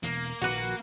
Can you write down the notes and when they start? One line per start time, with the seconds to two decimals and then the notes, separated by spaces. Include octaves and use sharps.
0.03 E1 B2 E3 A#3
0.42 A#1 D#3 F3 F#4 B4